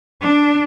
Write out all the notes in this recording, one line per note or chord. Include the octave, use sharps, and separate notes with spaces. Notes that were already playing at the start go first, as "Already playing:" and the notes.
D4